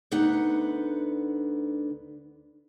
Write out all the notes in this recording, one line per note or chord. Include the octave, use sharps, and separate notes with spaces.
D2 D3 B3 D#4 F#5